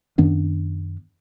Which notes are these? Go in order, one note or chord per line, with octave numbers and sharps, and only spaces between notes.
F#2 D#3 B3 D4